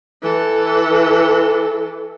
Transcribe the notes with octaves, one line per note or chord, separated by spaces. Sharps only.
E3 A4